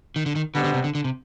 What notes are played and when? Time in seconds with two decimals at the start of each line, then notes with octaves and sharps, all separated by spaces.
0.16 D#3
0.26 D3
0.35 D#3
0.54 B2 D3 G3 C4
0.64 D3
0.74 C3
0.84 D3
0.95 D3
1.04 C3